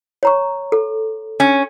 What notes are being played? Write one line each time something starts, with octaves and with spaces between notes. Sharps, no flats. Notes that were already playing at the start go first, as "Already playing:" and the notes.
C#5 A#5 C#6
A4
C#4